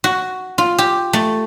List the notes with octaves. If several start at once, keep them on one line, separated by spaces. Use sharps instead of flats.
F#4
F4
G4
A3